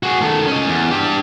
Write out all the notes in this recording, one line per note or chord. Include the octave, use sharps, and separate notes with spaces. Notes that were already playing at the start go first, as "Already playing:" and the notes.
F#4 G#4
D#3 A3
C#4 D#5
E2
D4 G4